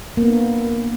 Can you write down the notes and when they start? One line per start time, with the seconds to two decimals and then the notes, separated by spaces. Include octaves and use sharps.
0.17 A#3
0.22 B3
0.27 D4